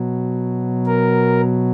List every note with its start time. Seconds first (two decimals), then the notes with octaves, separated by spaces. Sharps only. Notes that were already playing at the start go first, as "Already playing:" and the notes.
Already playing: B2 F#3
0.86 A#4